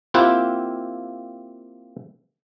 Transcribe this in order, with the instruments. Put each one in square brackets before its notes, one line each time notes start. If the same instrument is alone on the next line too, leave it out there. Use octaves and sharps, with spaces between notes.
[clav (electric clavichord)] A#3 C4 E4 F4 G4 F#5